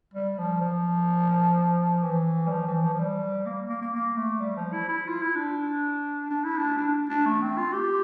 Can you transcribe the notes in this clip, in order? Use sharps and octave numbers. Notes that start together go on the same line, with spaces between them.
G3
F3
F3
E3
G3
F3
E3
F3
F3
G3
A#3
A#3
A#3
A#3
A3
G3
F3
E4
E4
F4
E4
D4
D4
E4
D4
D4
D4
A3
C4
F4
G4